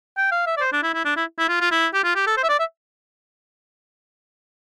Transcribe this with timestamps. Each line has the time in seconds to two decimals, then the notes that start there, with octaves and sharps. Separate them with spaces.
0.17 G5
0.32 F5
0.47 E5
0.57 D5
0.61 C5
0.72 D4
0.83 E4
0.94 E4
1.05 D4
1.16 E4
1.38 E4
1.49 F4
1.61 F4
1.71 E4
1.94 G4
2.04 F4
2.15 G4
2.27 A4
2.37 C5
2.43 E5
2.49 D5
2.59 E5